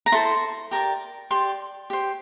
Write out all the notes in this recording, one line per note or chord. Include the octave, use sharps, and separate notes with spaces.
A#5
E4 A4 C5 C6
G4 A#4 D5
G4 D5 C6
G4 C5